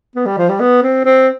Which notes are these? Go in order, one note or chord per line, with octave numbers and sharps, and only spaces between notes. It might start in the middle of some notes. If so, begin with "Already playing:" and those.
B3
G3
F3
G3
B3
C4
C4